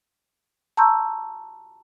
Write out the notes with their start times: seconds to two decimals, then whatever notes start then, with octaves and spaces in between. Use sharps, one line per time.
0.77 A5 A#5 C6 C#6 E6 G6